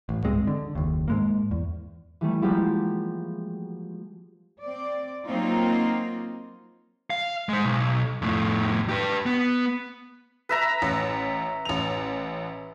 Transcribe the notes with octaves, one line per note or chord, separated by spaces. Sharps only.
A1
C#2 G2 G#3 C4
D3
F#1 D#2
G#2 G#3 A#3
E2
E3 G3 A3
F3 G3 G#3 A#3 F#4 G4
C4 D5
F#3 A#3 C4 D#4 F4
F5
G#3 C5
B1
F2 A2
G4 B4
B3
B4 E5 A#5
A1
A1 F7